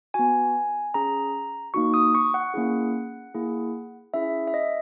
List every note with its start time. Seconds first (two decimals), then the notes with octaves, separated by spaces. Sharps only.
0.14 B3 F#4 G#5
0.94 C#4 G#4 A#5
1.74 A#3 D#4 F#4 C#6
1.94 D#6
2.15 C#6
2.34 F#5
2.54 A#3 C#4 E4 G#4
3.34 A#3 E4 G#4
4.14 C#4 E4 G#4 E5
4.48 E5
4.54 D#5